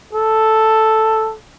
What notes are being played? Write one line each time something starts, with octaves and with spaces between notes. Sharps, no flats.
A4